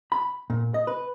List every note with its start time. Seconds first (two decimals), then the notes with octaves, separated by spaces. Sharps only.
0.12 B5
0.50 A#2
0.74 D#5
0.87 B4